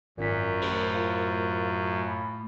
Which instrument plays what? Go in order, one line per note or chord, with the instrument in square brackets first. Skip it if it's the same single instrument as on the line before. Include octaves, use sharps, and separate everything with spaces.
[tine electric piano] G#1 C#4 B6 [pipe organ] F#2 [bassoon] A#2
[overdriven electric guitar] A2 [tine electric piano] G4 A#4 C5
[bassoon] F4
[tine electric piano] B5